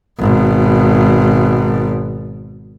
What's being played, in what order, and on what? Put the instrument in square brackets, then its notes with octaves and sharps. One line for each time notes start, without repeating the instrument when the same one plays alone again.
[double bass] G#1 B2